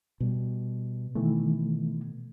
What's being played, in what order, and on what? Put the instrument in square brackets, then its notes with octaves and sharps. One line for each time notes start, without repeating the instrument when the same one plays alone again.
[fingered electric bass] B2 G3
[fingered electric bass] B2 [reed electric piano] D#3 E3 A3